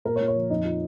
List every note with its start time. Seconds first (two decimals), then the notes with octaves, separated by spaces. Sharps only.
0.05 A#2 A#4
0.16 C#5
0.20 A#2
0.28 C#5
0.35 F3
0.50 F2 D#4
0.65 F3